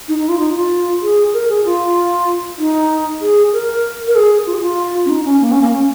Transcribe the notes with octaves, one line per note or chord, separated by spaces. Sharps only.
D#4
D#4
F4
D#4
F4
G#4
A#4
G#4
F4
D#4
G#4
A#4
A#4
G#4
F4
G#4
F4
C#4
D#4
C#4
A#3
C#4
A#3
C#4